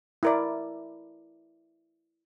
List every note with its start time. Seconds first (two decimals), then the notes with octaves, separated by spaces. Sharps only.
0.23 E4 A#4 D5